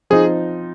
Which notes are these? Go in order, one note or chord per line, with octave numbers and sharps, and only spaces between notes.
F3 C4 D#4 G#4